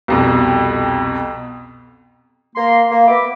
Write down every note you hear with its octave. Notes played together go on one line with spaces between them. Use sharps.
C2 F2 B2
A#3 C6
A#3
B3 E5 B5 D6